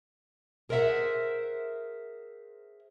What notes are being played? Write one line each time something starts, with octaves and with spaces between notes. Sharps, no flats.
G#4 A#4 C5 D5 E5 F#5